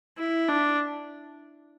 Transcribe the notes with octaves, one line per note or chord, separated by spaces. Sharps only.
E4
D4